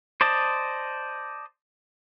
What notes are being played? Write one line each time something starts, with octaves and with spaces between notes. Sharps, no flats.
C5 D5 D#5 A5